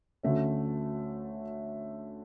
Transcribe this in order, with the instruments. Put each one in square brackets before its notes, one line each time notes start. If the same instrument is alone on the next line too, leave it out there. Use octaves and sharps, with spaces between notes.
[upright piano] D2 D3 A3 C#4